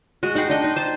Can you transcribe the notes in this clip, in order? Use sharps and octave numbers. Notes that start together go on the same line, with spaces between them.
G#3 F#4
D#4 F#5 G5 C6
D4 D#5 G5
D#4
C5 A5